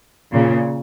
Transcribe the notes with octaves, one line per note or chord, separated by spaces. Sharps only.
A#2 C#3